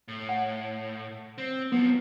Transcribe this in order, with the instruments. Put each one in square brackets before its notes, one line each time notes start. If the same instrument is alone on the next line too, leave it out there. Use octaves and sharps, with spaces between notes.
[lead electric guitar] A2
[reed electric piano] F#5
[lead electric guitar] C4
[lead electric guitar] F3 F#3 [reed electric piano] B3